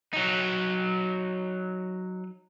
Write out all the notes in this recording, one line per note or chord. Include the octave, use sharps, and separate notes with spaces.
F#3 D#4